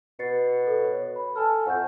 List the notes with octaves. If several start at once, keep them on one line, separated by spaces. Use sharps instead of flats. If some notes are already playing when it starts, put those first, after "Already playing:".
B2 A6 C7 C#7
A4
C#5
B5
A4 G#5 A5 F6
F2 F#5 C#6 G6